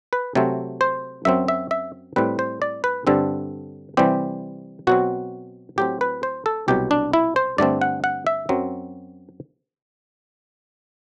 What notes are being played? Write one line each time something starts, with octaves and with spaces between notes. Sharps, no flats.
B4
C3 F#3 A3 C4
C5
F#2 F#3 C4 E5
E5
E5
A2 G3 C4 B4
C5
D5
B4
G2 D3 G3 C4 A4
C3 E3 G3 C4 G4
B2 F#3 C4 F#4
A2 F#3 C4 G4
B4
C5
A4
C2 B2 F#3 G4
D4
E4
C5
G2 D3 A3 C4 D5
F#5
F#5
E5
F#2 F#3 C4